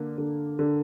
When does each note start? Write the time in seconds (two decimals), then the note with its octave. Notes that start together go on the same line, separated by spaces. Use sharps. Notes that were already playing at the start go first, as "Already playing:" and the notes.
Already playing: D3 A#3
0.18 D3
0.59 D3